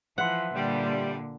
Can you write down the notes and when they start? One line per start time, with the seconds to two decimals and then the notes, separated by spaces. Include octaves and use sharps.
0.18 E3 F3 B4 E5 F#5 C6
0.55 A#2 D3 G3